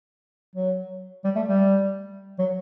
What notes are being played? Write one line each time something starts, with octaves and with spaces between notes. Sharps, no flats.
F#3
G3
A3
G3
F#3